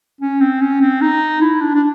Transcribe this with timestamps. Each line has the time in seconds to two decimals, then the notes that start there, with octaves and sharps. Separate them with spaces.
0.21 C#4
0.41 C4
0.61 C#4
0.81 C4
1.01 D#4
1.41 E4
1.61 D4
1.75 D4